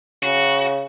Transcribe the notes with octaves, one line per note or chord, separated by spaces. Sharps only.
C#3 F#4